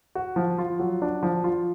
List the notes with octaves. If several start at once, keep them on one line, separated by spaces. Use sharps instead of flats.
F#4
F3
F4
F#3
D4
F3
F4